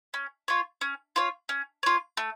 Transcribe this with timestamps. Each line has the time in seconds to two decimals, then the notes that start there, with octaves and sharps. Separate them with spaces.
0.14 C#4
0.48 F4 C#5
0.81 C#4
1.16 F4 C#5
1.49 C#4
1.83 F4 C#5
2.17 A3